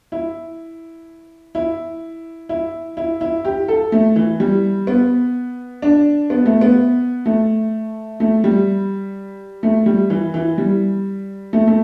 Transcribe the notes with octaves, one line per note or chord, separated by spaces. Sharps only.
E4
E4
E4
E4
E4
G4
A4
A3
E3
G3
B3
D4
B3
A3
B3
A3
A3
G3
A3
G3
E3
E3
G3
A3
A3